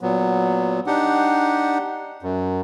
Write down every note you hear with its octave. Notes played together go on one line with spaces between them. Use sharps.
A#2 F#3 B3
D4 D#4 G4 F#5
F#2